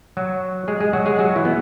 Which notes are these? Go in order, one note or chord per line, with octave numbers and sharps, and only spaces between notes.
F#3 F#4
G#3 G#4
G#3 G#4
F#3 F#4
G#3 G#4
F#3 F#4
E3 E4
B3